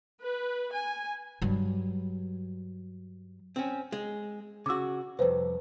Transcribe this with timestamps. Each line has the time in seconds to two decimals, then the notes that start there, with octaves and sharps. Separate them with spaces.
0.21 B4
0.71 G#5
1.42 G2 F#3
3.56 C4 C#4
3.92 G#3
4.66 C#3 F#4 D6 E6
5.19 C2 F2 B4 C5